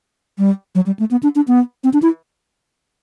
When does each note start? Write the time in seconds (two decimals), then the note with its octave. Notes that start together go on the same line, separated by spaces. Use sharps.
0.38 G3
0.75 F#3
0.86 G3
0.99 A3
1.11 B3
1.23 D4
1.36 D4
1.48 B3
1.84 C4
1.93 D4
2.02 E4